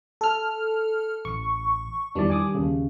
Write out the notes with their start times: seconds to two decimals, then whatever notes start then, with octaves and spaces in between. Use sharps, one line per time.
0.21 A4 F6
1.25 A1 C#6
2.15 E2 D#3 E3 G3 D4 D5
2.30 G#5 D6 D#6
2.55 D#2 C#3